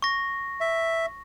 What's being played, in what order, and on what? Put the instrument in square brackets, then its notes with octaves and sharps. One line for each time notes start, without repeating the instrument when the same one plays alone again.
[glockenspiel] C#6 A#6
[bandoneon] E5